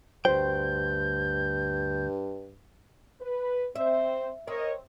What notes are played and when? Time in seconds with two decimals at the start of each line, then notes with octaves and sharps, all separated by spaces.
0.25 D2 G2 C5 G5 G6
3.21 B4
3.76 C4 C5 E5
4.48 C4 A#4 C#5 D#5